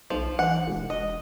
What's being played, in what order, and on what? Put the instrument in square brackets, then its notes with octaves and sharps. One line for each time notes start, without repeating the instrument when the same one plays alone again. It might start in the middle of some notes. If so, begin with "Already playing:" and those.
[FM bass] B1 [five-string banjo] F3
[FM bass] E3 [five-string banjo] F#5
[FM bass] E1
[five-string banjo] D#5